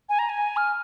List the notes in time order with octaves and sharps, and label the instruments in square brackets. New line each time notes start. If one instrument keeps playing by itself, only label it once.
[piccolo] G#5
A#5
G#5
F6